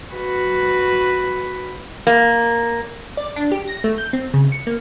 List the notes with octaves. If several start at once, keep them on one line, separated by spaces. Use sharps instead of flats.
F#4 B4
A#3
D5
D4
G4
A#6
A3
G6
C4
C#3
C#7
A#3